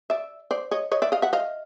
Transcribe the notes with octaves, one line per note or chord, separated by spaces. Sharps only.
D5 E5
C5 D5
C#5 D#5
C#5 D#5
D5 E5
D#5 F5
E5 F#5
D#5 F5